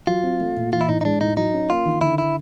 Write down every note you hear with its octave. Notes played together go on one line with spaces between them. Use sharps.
F#3 F4
C4
A3
A#2
E3 F4
E4
A2 D#4
D#4
G#3 D4
A2 D#4
F#3 D#4
C#4
A#3 F4
D#3
D3 E4
E4